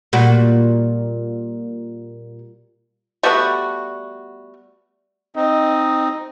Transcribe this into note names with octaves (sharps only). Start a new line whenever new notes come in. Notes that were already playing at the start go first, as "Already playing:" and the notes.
A#2 G3 F#4
G3 A3 B3 F#4
C4 D#4 D#5